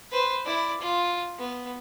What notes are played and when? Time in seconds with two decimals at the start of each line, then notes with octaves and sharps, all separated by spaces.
0.12 B4 C5
0.45 E4 D5
0.81 F4
1.39 B3